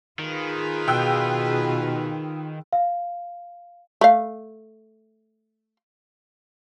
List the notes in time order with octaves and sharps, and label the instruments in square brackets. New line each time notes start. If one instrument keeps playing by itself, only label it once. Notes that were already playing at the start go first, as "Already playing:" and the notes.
[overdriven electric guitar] D#3 [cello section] F4 G#4 B4
[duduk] B2 [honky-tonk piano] G5 E6 F#6
[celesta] F5
[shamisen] A3 F5